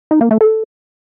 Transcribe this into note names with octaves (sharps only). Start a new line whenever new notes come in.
D#4
A#3
A3
A4